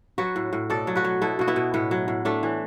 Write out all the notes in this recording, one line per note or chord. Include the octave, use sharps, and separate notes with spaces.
F#3 F#4 B4
A2
A2
B2 A4 D5
F#3
F#4 B4
F#3
B2 E4 A4
B2 F#4
B3 E4
B2
A2 B3
F#3
A2
A2 A3 D4
E3